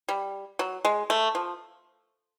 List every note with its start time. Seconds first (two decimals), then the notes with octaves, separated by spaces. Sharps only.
0.09 G3
0.59 F#3
0.85 G#3
1.10 A3
1.35 F3